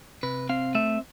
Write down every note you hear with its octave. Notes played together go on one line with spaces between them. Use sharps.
C3 B4
C4 F5
A3 E5